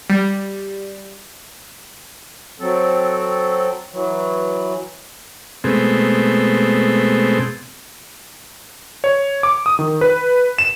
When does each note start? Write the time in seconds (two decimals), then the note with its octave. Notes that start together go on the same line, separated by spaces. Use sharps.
0.10 G3
2.60 F#3 C4 A4
3.93 E3 F#3
5.64 B2 G#3 A3 C4
9.04 C#5
9.43 D6
9.66 D#6
9.79 D#3
10.01 B4
10.58 E7